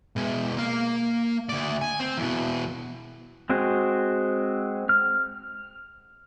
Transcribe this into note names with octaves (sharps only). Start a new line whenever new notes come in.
B2 G#3
A#3 F5
D2 D5
G#5
C4
E2 B2
G#3 C4 F#4 G#4
F6